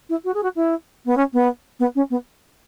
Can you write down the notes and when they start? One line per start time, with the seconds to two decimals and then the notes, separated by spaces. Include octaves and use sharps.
0.09 E4
0.24 F#4
0.34 G#4
0.43 F#4
0.55 E4
1.06 B3
1.17 C#4
1.33 B3
1.79 B3
1.95 C#4
2.10 B3